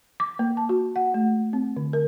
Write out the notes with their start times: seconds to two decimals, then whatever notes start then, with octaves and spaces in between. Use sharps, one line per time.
0.20 D6
0.39 A#3
0.57 A5
0.69 F#4
0.96 F#5
1.14 A3
1.53 C4
1.77 D3
1.93 A#4